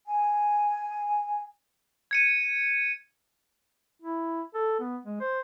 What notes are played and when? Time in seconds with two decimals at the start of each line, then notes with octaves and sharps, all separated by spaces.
0.06 G#5
2.11 G#6 C#7 D#7
4.02 E4
4.55 A4
4.80 B3
5.05 G#3
5.20 C5